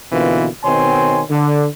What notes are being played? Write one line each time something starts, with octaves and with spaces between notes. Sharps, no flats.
B2 D3 E3 A#3 C4 F4
B2 D#3 C4 C#5 G#5 C6
D3